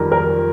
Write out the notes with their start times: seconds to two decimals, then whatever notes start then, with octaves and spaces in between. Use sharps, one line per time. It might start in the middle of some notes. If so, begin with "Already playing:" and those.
Already playing: F2 D#3 G3 A#4
0.12 A#4